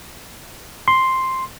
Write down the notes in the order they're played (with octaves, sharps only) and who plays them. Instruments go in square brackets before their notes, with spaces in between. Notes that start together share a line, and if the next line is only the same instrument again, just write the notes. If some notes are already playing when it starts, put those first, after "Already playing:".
[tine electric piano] C6